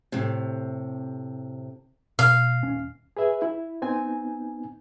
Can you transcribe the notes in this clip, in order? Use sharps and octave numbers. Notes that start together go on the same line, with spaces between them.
A2 C3
B2 F5
D#1 C#4
G#4 B4 E5
E4
B3 C4 D#4 G#5